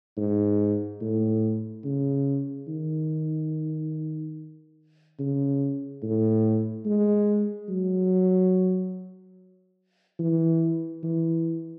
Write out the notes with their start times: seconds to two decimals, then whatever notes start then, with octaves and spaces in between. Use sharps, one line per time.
0.17 G#2
1.01 A2
1.85 C#3
2.68 D#3
5.19 C#3
6.03 A2
6.86 G#3
7.69 F#3
10.19 E3
11.03 E3